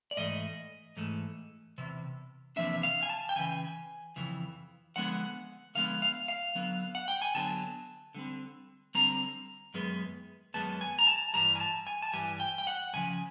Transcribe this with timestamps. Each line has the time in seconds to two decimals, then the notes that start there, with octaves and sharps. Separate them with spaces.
0.11 D5
0.17 G#2 E3 A3 D#5
0.97 G#2 E3 A3
1.78 E2 C3
2.56 E2 C3 F3 A#3 D4 E5
2.83 F5
3.03 G#5
3.09 A5
3.29 G5
3.36 F2 C#3 E3 G#5
4.16 F2 C#3 E3
4.96 D3 F3 G#3 B3 F#5
5.75 D3 F3 G#3 B3 F5
6.02 F5
6.28 F5
6.55 D3 F#3 B3
6.95 F#5
7.08 G5
7.22 G#5
7.35 D3 F#3 B3 A5
8.15 D3 G3 C4
8.95 D3 G3 C4 A#5
9.74 F#2 D#3 G#3 B3
10.54 F#2 D#3 G#3 B3 A5
10.81 G#5
10.99 A#5
11.07 A5
11.34 G2 E3 G3 A#5
11.55 G#5
11.60 A5
11.87 G#5
12.02 A5
12.14 G2 E3 G3 G#5
12.40 G5
12.58 G5
12.67 F#5
12.93 F#2 C#3 F3 G#5